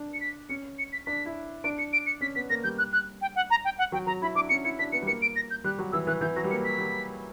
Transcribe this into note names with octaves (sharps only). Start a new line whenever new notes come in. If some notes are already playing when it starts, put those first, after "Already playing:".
Already playing: D4
C#7
B6
C#4 C#7
C#7
B6
D4 B6
E4
D4 D7
C#7
D7
C#7
C#4 B6
B3 B6
A#3 A#6
G3 G6
F#6
F#6
G5
F#5
A#5
G5
F#5
F#3 G5
F#3 A#5
E4 B5
D4 D6
C#4 C#7
E4 C#7
D4 B6
B3 C#7
G3
A#3 C#7
D7
A#6
G6
G3 F#6
F#3
E3 E6
E3 F#6
E3 G6
F#3 A#6
G3
A#3 C#7
B6
G3